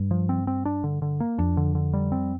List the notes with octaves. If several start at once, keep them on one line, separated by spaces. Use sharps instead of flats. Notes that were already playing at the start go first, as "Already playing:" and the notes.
Already playing: G2
F3
C4
C4
D4
D3
D3
A#3
F2 D4
D3
D3
G3
C4